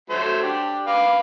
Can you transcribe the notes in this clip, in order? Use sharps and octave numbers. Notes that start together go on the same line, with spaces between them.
F#3 A3 C5
D4 G4
B4 F5 D6